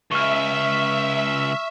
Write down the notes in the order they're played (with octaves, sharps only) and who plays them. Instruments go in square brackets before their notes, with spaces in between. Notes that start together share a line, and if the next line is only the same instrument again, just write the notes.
[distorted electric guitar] C#2 [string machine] E5 [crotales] C#6 F6